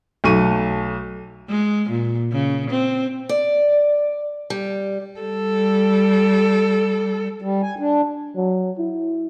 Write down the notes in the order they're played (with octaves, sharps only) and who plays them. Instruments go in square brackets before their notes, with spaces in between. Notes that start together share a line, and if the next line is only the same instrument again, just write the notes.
[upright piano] B1 A3 C#6 D#7
[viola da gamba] G#3
A#2
C#3
C4
[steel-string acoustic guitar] D5
G3
[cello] G3 A4
[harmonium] G3
G#5
D4
[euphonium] F#3
E4